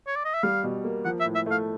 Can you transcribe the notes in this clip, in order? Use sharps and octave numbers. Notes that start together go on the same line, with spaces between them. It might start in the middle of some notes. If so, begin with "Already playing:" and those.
C#5
D5
D#5
E5
G3 F5
B2
A#3
F3 F#5
E5
A2
E5
A3
F5